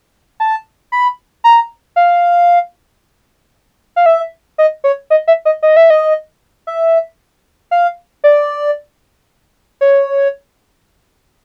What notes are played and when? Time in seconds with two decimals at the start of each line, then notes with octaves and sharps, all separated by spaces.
0.40 A5
0.92 B5
1.44 A#5
1.96 F5
3.96 F5
4.06 E5
4.58 D#5
4.84 C#5
5.10 D#5
5.27 E5
5.45 D#5
5.63 D#5
5.77 E5
5.90 D#5
6.67 E5
7.71 F5
8.24 D5
9.81 C#5